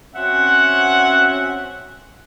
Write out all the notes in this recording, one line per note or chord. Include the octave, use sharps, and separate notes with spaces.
C4 C#4 F#4 E5 F#5